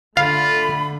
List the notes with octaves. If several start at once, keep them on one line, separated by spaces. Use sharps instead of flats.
D3 A3 F4 F5 B5